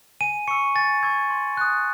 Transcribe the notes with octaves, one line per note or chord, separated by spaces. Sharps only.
G#5 D#7
C#6 E6 C#7
G#5 A6
C#6 E6 G#6
C6
D#6 F#6